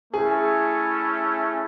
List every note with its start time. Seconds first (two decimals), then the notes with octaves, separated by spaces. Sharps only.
0.13 A3 C#4 E4 G#4